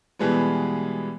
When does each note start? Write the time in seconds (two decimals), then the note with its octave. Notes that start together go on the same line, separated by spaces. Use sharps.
0.19 B2 E3 G3 G#3 B3